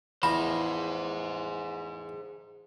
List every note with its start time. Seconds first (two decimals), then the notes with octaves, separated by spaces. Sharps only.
0.23 E2 F3 G#4 C5 A#5 B5